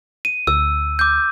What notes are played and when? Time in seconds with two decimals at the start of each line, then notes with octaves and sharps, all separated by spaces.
0.25 D#7
0.47 D2 E6
0.99 D6 G6